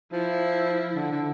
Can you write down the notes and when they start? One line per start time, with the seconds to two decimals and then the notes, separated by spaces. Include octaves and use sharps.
0.13 F3 E4
0.95 D3
1.11 D3